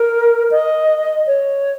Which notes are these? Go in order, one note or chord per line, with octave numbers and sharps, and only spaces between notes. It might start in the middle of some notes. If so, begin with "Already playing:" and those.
Already playing: A#4
D#5
C#5